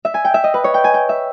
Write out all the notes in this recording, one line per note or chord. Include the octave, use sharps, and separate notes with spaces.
E5
G#5
G5
E5
D#5
B4
C#5
G5
G#5
G5
E5